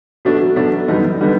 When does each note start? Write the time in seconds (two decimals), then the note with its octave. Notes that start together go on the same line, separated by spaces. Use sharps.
0.25 B2 F#3 A3 D4
0.56 B2 F#3 A3 D4
0.88 F#2 D3 G3 B3 D#4
1.21 D3 G3 B3 D#4